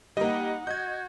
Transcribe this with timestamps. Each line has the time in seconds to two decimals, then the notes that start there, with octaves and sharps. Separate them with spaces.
0.17 G3 A#3 D#4 D#5 F#5
0.67 F#4 D#5 G6 G#6